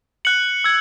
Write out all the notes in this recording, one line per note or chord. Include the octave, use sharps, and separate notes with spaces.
F#6 C#7 F#7
E6 G#6